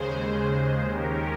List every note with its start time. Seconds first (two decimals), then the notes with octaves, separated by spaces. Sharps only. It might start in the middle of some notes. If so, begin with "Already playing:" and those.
Already playing: D#2 C#3 G#3 G#4 C5
0.89 D#2 D#3 G#3 C#4 G4 A#4